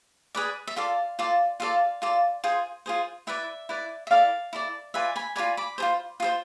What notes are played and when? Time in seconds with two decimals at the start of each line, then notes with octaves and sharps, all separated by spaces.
0.35 G#4 B4 D5
0.67 E5
0.76 F4 A4 D5 F5
1.19 F4 A4 D5
1.60 F4 A4 D5 F5
2.02 F4 A4 D5
2.44 F4 G#4 C5
2.86 F4 G#4 C5
3.27 E4 B4 D5 E5
3.69 E4 B4 D5
4.07 E5
4.11 E4 A4 D5 F5
4.53 E4 A4 D5
4.94 F4 B4 D5 E5 G#5
5.16 G#5 B5
5.36 F4 B4 D5 G#5 B5
5.57 B5 D6
5.78 F4 G#4 C5
6.20 F4 G#4 C5